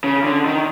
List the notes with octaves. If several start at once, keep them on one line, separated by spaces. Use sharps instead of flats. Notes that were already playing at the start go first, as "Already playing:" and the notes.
C#3
D3
D#3